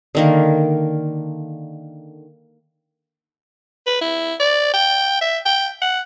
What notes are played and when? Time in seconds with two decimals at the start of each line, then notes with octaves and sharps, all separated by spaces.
0.15 D3 D#3 A#3
3.87 B4
4.01 E4
4.40 D5
4.73 G5
5.21 E5
5.45 G5
5.82 F#5